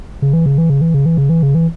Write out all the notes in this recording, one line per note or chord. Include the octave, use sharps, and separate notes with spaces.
C#3
E3
C#3
E3
C#3
E3
C#3
E3
C#3
E3
C#3
E3